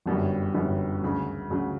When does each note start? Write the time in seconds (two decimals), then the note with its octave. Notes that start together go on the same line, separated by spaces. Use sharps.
0.06 G1 F#2 D3 G3 C#4
0.54 G1 F#2 D3 G3 C#4
1.02 D2 C#3 F#3
1.50 D2 C#3 F#3